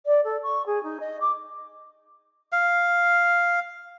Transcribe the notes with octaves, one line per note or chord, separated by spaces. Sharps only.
D5
A4
C#6
G#4
D#4
D#5
D6
F5